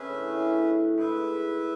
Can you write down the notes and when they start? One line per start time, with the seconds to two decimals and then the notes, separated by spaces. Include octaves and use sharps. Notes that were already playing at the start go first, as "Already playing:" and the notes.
Already playing: D3 C#4 G#4 B4 E5
0.11 A2
0.28 A2
0.98 G#2 E4 B4 E5